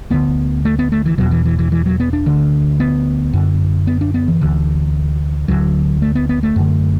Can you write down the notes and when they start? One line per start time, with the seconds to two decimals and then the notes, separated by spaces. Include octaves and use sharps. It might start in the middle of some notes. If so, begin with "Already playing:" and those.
0.10 D2 D3 B3
0.65 A3
0.79 B3
0.92 A3
1.06 E3
1.18 E2 B2 F#3
1.31 E3
1.45 E3
1.59 E3
1.72 E3
1.86 F#3
2.00 B3
2.13 D4
2.26 D2 D3
2.80 B3
3.33 F#2 D3
3.87 B3
4.01 D4
4.14 B3
4.28 E3
4.41 D2 D3
5.48 D2 D3 F#3
6.02 A3
6.15 B3
6.29 B3
6.43 A3
6.56 F#2 D3